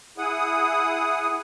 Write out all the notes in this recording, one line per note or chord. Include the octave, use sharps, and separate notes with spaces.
E4 G#4 F#5 D#6